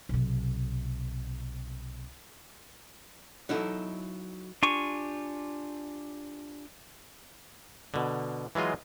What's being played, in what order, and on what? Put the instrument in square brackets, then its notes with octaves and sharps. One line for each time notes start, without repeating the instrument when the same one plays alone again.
[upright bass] B1 C3
[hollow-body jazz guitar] F#3 D#4 E4 A4
[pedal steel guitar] D4 F4 G4 G#5 C#6
[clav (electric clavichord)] B2 D3
E3 F#3 G#3 F4 D#5